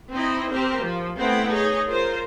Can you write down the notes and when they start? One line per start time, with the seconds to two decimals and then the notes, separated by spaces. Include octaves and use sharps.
0.12 C4 D#4 E4 D#5
0.51 C4 G4 A#4 C5
0.82 F3
1.17 A3 B3 C4 E4 F#5 G5
1.50 D#4 G#4 C#5 D#5
1.87 F4 A#4 C5